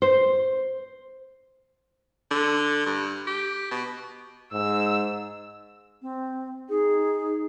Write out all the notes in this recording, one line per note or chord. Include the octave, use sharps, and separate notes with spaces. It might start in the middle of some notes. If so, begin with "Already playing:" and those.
C5
D3
G2
G4
B2
G#2 E6
C4
D#4 G#4